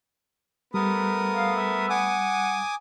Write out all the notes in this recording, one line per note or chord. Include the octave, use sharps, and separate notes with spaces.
G3 A3 B3 A#4 D#6
F5
E5
F#5 G#5 D6 D#6